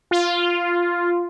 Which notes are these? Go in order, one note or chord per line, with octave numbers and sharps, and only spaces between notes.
F4